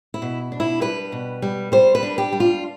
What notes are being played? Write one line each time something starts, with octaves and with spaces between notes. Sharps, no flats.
E4
B2
D4
E4
G3 B4
B2
G3
G3 C5
B4
D4
G4
G3
F4